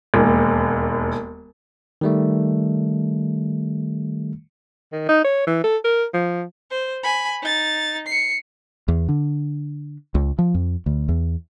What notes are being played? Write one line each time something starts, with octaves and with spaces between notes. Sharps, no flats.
E1 D#2
D#3 G3 A3
D#3
D#4
C#5
E3
A4
A#4
F3
C5
G#5 B5
D#4 A6
C7 C#7
E2
D3
C#2
F3
F2
D2
E2